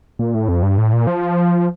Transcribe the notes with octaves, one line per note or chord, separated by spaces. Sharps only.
A#2
A2
F2
G2
A2
A#2
F3